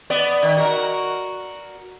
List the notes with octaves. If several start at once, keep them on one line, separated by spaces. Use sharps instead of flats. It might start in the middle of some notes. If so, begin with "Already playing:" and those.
B3 D5
D#3
F#4 A#4